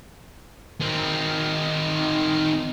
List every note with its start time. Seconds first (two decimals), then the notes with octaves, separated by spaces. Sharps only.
0.81 D#3 C4